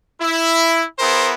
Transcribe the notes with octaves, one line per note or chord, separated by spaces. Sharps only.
E4
B3 E4 G#4 A#4 C5